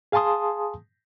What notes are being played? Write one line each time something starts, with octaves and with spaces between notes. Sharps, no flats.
G#4 F5 G#5 A5 C6 D#6